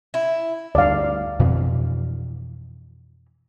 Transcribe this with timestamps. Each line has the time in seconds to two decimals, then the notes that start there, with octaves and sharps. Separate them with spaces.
0.14 E4
0.75 D2 G2 D5 F5
1.40 F2 B2 E3